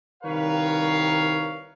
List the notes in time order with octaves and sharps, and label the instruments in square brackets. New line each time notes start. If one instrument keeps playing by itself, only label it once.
[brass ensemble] C2 D#3 A#4 B4 C#5 F5